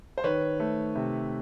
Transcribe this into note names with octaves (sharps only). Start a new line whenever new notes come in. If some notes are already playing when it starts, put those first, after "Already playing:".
C5
D#3 B4 C#5
A3
C3